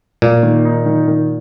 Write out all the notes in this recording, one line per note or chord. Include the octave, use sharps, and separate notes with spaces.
A#2 A#3
D#3
D#4
D#3
D#3